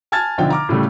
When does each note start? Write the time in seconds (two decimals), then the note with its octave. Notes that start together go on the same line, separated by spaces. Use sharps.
0.12 G#5 A5 F6 G#6 A6
0.38 B1 D3 F3 G5
0.50 A#5 D6 F6
0.69 A2 C#3 G3 A3